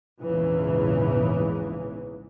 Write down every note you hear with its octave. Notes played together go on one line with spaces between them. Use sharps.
A#1 E2 G#2 C#3 E3